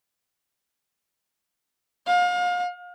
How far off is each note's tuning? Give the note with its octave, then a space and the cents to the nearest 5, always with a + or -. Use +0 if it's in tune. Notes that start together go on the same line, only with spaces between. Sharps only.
F5 +35